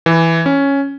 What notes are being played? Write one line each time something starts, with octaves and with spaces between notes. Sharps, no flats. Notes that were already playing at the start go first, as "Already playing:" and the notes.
E3
C#4